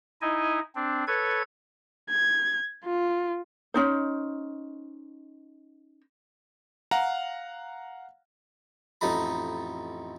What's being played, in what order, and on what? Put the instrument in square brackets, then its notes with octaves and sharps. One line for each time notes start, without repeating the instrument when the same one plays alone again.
[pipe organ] D#4 E4 D#5 G#5
C4 D4
A4 B4 C#5 G#6
[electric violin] G#6
F4
[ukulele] C#4 D#4 C5
[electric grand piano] F5 F#5 A#5
[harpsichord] A1 F2 D#4 A4 D#5 B5